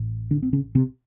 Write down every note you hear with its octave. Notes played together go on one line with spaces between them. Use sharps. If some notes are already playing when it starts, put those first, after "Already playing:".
Already playing: A1 A2
D3 D4
C4
C#3 C#4
C3 C4